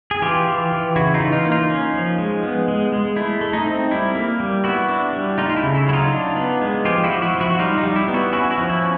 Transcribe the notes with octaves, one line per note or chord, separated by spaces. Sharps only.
G#4
E3 F4 G4
E3
E3
C#3 E4 F#4
D#4 F4
E3
D#4 F4
A#3
D#4 F4
C#4
F3
G#3
B3
G#3
G#3
A3 E4
A3
D#4
C4
G3 E4
A#3
G3
B3 E4 F#4
D4
G3
A3 D#4 F4
F4
E4
C#3
E4
F#3 E4
D#4 F4
D4
B3
G#3
F3 F4 G4
E4 F#4
F3
E4 F#4
F3
E4 F#4
F#4
G3 D#4 F4
D#4
G3
E4
B3
E4 F#4
C#4 E4 F#4
E4 F#4
F3
E4
C#4